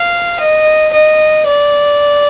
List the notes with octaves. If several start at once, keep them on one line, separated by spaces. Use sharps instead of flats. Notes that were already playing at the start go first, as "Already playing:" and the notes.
Already playing: F5
D#5
D#5
D5